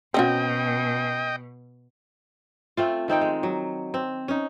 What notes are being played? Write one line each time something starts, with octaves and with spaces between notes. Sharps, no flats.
B2 C4 C#4 F#4 D#5 G5
A3 C4 F4
D#3 C4 D#4 G5
G#3
F#3
C4
C#4 D#4